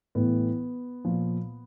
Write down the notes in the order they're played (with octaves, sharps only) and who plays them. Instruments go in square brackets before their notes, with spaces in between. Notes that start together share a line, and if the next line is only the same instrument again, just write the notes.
[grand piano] A2 E3 B3
A#2 F3